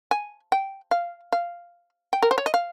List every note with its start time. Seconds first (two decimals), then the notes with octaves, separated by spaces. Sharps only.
0.11 G#5
0.52 G5
0.91 F5
1.32 F5
2.13 G5
2.22 A#4
2.31 C5
2.38 C#5
2.46 D#5
2.54 F5